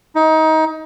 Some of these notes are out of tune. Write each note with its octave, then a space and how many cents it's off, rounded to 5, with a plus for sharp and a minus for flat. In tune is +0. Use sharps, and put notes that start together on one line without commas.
D#4 +25